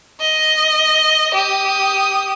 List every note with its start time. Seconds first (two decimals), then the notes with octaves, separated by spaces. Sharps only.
0.21 D#5
1.34 G4 D#6